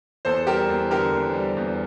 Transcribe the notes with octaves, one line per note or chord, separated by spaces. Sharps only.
E2 A4 C5
G3 G4 A#4
E2
D3 G4 A#4
E2
G3
E2